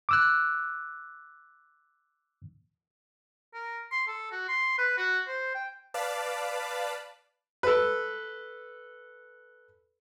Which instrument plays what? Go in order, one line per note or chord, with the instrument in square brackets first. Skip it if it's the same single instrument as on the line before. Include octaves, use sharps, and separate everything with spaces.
[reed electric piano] D6 E6 F#6
[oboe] A#4
C6
A4
F#4
C6
B4
F#4
C5
G5
[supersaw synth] B4 D5 F5 A5 B5 D6
[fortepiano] A4 B4